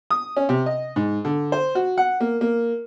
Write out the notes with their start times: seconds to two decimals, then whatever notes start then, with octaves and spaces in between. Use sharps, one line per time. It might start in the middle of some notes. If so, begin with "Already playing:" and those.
0.11 D#6
0.37 C#4
0.49 C3
0.66 D#5
0.96 G#2
1.25 D3
1.52 C5
1.75 F#4
1.97 F#5
2.21 A#3
2.41 A#3